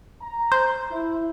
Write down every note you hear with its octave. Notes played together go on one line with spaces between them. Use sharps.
A#5
C5
E4